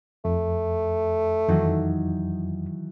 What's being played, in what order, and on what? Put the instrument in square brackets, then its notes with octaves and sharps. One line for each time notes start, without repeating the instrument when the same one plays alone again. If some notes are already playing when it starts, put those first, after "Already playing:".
[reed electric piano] F2 [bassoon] A3
[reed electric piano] F2 [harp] D#3 E3 F#3